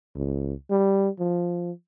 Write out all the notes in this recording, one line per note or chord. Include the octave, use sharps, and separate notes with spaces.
C#2
G3
F3